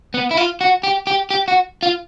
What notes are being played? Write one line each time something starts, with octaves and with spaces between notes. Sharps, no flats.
B3
E4
F4
F#4
G4
G4
G4
F#4
F4